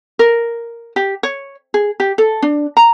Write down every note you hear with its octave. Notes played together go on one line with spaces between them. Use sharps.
A#4
G4
C#5
G#4
G4
A4
D4
A#5